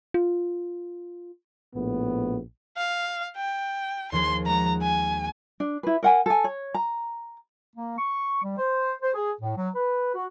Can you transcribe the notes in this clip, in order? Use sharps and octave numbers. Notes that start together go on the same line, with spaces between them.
F4
A#1 A2 B3
F5
G5
D#2 F3 G#4 C6
G#3 F#4 A#5
G#5
D4
E4 B4
A#4 F#5 G#5
A4 G#5
C#5
A#5
A#3
C#6
G3
C5
C5
G#4
A2
F#3
B4
F#4